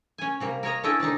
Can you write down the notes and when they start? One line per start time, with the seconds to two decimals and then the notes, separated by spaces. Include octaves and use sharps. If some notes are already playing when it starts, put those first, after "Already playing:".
0.18 C#4 G#5
0.40 C3 G3 A#3
0.63 A#4 C#5 D#5 A#5
0.83 C#4 D4 E4 A4 D#5 G5
1.00 C3 D#3 D4 D#4